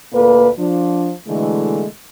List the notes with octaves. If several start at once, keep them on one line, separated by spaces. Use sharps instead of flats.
D2 A#2 A#3 A4 B4
F3 D4
B2 D3 E3 G#3 A3